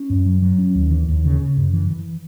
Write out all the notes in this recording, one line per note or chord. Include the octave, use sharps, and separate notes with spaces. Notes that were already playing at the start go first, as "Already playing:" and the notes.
Already playing: C#4
F#2
F#3
F#3
C#4
D#2
E3
D#2
C#3
C#3
F#2
E3
E3